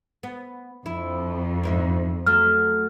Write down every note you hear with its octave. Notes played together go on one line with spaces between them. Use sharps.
B3
F2 E4
G#2 A#4 E5
F#3 A3 F6